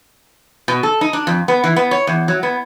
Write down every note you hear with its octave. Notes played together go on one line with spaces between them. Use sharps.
B2
A4
D#4
D4
F2
B3
E3
B3
C#5
E2
F#3
B3